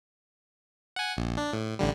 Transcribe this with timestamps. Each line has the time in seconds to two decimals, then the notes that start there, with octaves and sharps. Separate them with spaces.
0.96 F#5 G#5
1.17 A#1
1.37 D4
1.53 A2
1.79 A1 D3 G3